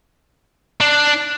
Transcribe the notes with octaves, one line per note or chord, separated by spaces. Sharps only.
D4